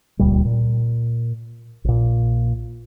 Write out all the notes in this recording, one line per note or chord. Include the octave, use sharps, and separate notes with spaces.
D#1 C#2 A#2 G3
A#2
A#1 A#2